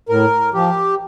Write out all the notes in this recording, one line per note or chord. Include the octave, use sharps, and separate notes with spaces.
A2 A#4
F3 G4